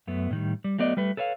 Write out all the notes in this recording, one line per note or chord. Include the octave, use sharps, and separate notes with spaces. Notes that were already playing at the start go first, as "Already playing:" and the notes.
F#2 A3 B3
A2 D#3 G3
G3
F#3 A3 B3 D5 D#5
G3 A3 B4
A4 B4 C#5 E5 F5